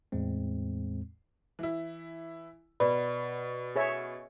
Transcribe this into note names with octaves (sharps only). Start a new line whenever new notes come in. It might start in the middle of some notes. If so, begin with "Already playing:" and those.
E2 A2 G#3 C4
E3 E4
B2 B4 D5 B5
G#4 C#5 E5